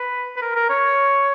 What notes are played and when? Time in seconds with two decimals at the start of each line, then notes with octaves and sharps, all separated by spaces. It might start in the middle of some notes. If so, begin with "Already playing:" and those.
Already playing: B4
0.36 B4
0.42 A#4
0.55 A#4
0.69 C#5